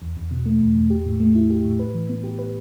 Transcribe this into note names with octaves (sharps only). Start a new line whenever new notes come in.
E2
E2
B2
A3
E2
E2
G4
A2
A3
E4
G4
A2
B4
E3
B3
G4
B4